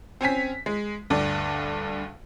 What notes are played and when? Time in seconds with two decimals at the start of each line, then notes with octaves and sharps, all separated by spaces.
0.21 C4 C#4 G#5 B6
0.66 G#3
1.10 D2 G2 D5